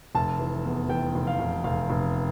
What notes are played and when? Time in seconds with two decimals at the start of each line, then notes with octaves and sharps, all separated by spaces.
0.15 F1 A5
0.39 E3
0.65 E2
0.89 E3 G5
1.15 F1
1.27 F5
1.39 F1
1.64 F1 F5
1.90 F1